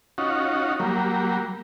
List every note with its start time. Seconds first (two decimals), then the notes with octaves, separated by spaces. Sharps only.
0.18 C#4 D#4 F4 F#4
0.80 F#3 G3 A#3